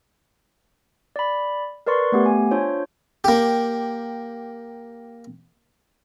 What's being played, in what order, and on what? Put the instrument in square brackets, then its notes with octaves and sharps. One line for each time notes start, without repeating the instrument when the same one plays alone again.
[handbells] D5 B5
A#4 B4 D5 C6 C#6
A3 B3 G4
G#5
D4 F4 C5 C#5
[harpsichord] A#3 G4